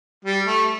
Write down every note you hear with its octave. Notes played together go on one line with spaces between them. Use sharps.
G3
A3